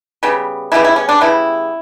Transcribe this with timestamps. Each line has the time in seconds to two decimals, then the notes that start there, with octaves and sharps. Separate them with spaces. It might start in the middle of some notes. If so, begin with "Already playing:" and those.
0.23 C#3 G3 B3
0.72 C#3 G3 B3 E4
0.85 E4
0.96 C#4
1.09 D4
1.21 C#3 G3 B3 E4